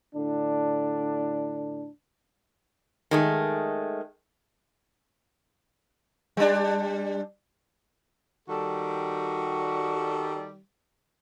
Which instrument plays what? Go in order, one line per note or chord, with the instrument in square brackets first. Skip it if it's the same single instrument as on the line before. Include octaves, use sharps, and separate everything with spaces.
[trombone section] A2 D3 D4
[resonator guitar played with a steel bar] D#3 G#3 A3
[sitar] G3 D4
[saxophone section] D#3 G3 [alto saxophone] F#4 [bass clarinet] A4